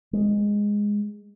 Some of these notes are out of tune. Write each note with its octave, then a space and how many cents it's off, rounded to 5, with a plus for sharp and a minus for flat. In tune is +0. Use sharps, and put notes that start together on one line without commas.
G#3 -10